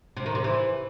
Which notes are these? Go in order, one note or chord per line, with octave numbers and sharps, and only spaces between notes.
C3
D#3
C3
E3